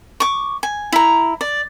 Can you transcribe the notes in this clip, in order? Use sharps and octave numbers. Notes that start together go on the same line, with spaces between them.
C#6 D6
G#5
E4 A#5
D5